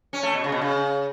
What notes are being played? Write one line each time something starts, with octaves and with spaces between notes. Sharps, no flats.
C#4
A3
B2
C#3
B2
C#3